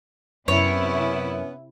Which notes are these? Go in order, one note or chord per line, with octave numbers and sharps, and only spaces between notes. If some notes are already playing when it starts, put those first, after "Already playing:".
F#2 C3 B3 C#4 E4 C#5